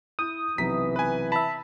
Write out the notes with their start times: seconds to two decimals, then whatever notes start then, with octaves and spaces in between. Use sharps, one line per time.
0.19 E4 D#6 G6
0.58 B1 C3 E3 A#5 B6
0.96 B4 G#5
1.32 E5 A5 B5